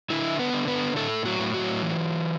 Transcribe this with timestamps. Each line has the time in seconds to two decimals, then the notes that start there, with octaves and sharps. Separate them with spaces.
0.10 D3 E4 E5
0.39 B3 B4
0.53 D3
0.68 B3 B4
0.96 A2 A3 A4
1.25 F#3 F#4
1.39 A2
1.54 F#3 F#4
1.83 E3